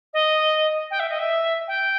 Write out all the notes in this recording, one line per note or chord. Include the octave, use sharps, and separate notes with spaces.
D#5
G5
E5
D#5
E5
G5